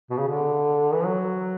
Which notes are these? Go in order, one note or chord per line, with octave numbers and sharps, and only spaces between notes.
B2
C#3
D3
E3
F#3